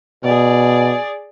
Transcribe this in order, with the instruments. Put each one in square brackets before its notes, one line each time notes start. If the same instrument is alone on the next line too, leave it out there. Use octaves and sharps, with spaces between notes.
[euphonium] B2 [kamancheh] G#4 D5